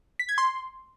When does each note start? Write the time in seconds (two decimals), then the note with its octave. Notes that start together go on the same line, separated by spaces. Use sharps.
0.19 B6
0.29 G#6
0.38 C6